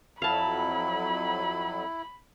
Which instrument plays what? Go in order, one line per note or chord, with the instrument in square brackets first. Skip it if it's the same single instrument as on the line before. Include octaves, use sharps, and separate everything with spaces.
[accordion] F2 F#3 [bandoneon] E4 [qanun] F5 A5 [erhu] B5